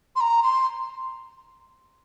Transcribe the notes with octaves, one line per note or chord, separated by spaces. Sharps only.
C6
A#5
C6